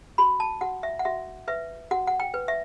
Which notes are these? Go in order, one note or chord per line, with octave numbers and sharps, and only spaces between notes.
F#4 B5
A5
F#4 F#5
E5
F#5
F#4 E5
B4 E5
F#4 F#5
F#5
G5
B4
E5